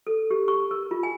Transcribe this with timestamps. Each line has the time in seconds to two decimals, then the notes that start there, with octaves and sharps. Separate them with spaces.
0.07 A4
0.31 G4
0.48 C#6
0.71 A#4
0.91 F4
1.03 G#5